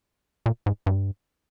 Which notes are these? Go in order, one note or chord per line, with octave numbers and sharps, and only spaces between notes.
A#2
G#2
G2